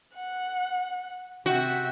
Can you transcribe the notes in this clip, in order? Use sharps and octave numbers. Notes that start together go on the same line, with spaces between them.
F#5
C3 F#4 E5 G5